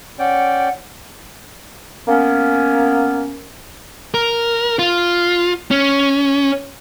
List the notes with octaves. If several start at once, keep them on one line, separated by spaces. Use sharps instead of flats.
C#4 D5 F#5 G5
A#3 B3 C#4
A#4
F4
C#4